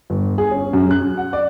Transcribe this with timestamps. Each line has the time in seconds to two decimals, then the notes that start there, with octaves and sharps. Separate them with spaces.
0.10 G1
0.38 G#4
0.51 C#4
0.73 F#2
0.91 F#6
1.17 F#5
1.33 D5